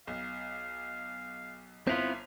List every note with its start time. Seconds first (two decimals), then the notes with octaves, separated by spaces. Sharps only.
0.07 B1 F5
1.87 G1 B3 C4 E4 F4 F7